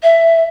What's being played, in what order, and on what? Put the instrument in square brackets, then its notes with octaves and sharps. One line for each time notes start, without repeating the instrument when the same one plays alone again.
[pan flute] E5